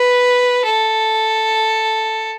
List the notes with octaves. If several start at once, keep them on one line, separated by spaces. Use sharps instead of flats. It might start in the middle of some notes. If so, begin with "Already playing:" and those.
Already playing: B4
A4